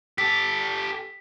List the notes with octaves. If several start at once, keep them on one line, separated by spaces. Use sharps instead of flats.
G4 A4 B6